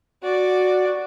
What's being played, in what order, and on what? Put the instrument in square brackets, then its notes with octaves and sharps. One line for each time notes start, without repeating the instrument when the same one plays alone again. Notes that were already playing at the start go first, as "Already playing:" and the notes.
[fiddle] F#4 D5